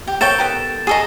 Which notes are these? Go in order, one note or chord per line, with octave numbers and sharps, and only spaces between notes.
G4
C3 A#3 A4 C#5 G5 A6 E7
B3 G4 A#4
F#4 G#4 A4 D#5 A#5